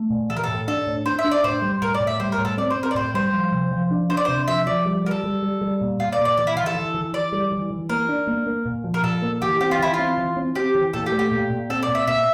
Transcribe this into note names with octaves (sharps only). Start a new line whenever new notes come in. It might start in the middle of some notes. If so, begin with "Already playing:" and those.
Already playing: A3
A#2
E3 A4
A#4
A4
A2
D4 A4
A2
D4 C5
E5
D4
D5
A2 C5
G3
A2 A#4
D5
A2
E5
G3 C5
A#4
A2
A4
C4 D5
C5
C4
A#4
D5
A2 C5
G3 C5
F3
C3
F3
D4
D4 C5
D5
C3 C5
F3 E5
F3 D5
G3
G3 A#4
A4
G3
G3
G3
A#2
A#2 F4
D5
A#2
D5
E3 D5
E4
E3 F4
A4
E3
E3
E3 D5
G3
E3
E3
A#3 A#4
D4
A#3
A#3
A#2
F3
A#4
A#2 A4
A#3
E3 G4
C4 G4
F4
E3 E4
F4
C4
E3
C4
C4 G4
E3
A#2 A4
G4
A3
G4
A#2
A#2
C4 A4
D5
A#2
E5
A#2 E5